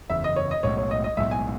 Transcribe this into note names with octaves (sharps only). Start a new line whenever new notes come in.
F#1 E2 C#3 E5
D#5
C#5
D#5
B1 A2 G#3 C#5
C#5
D#5
D#5
B1 A2 G#3 E5
G#5